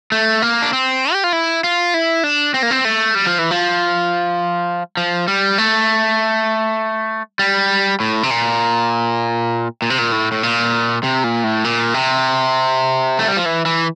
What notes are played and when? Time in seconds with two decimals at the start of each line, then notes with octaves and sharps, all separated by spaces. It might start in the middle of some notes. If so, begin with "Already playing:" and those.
0.12 A3
0.42 A#3
0.62 D4
0.73 C4
1.13 G4
1.24 F4
1.33 E4
1.64 F4
1.94 E4
2.24 D4
2.54 C4
2.63 A#3
2.71 C4
2.85 A3
3.15 G3
3.27 F3
3.39 E3
3.51 F3
4.97 F3
5.28 G3
5.58 A3
7.39 G3
8.00 A2
8.23 C3
8.31 A#2
9.82 A#2
9.90 C3
9.99 A#2
10.12 A2
10.32 A2
10.43 A#2
11.03 C3
11.24 A#2
11.44 A2
11.64 A#2
11.94 C3
13.19 A3
13.28 G3
13.37 F3
13.46 E3
13.66 E3